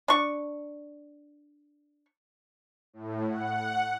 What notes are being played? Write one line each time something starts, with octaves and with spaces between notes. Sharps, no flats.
D4 C#6
A2
F#5